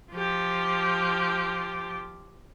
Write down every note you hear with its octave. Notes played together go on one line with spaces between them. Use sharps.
F3 G4